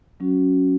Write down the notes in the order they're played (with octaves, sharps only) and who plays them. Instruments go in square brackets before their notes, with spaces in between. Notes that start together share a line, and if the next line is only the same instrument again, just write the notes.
[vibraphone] F#3 C#4 F#4